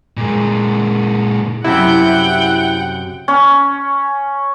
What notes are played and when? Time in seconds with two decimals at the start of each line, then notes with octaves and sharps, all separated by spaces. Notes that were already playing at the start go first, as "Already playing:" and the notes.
0.17 A#2 G#3
1.64 F#2 C3 E4 F#5 G5
3.28 C#4